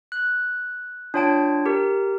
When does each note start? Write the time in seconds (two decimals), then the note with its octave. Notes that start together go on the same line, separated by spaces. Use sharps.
0.12 F#6
1.14 D4 F4 C#5 G5 A5 D7
1.66 G4 A#4